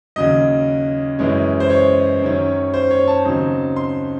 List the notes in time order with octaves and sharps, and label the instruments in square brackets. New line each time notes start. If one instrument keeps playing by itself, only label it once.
[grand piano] D#2 C#3 F#3 D#5
F#2 E3 G#3 C#4
C5
C#5
F#2 D#3 F#3 C#4
C5
C#5
A5
D#2 C#3 F#3 C4 D#4
C6